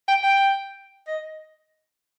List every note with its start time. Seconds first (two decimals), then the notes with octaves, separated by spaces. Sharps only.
0.08 G5
0.23 G5
1.07 D#5